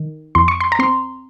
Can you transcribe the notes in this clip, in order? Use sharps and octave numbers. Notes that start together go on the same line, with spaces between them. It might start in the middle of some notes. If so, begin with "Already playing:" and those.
Already playing: D#3
F2 C6
C#6
C6
A#5
C4 C6